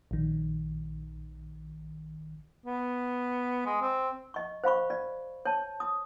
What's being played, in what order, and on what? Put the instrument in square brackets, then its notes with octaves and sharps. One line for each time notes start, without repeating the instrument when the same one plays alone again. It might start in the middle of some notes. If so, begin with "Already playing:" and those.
[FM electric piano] A#1 D#3
[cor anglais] B3
G#3
C4
[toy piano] D#5 C#6
C5 F5 B5 C#6
D5
C#5 A5
D#6